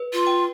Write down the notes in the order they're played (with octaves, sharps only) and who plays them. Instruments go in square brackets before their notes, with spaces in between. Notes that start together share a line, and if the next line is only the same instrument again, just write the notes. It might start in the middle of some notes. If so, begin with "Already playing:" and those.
Already playing: [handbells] B4
[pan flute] F4
[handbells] G5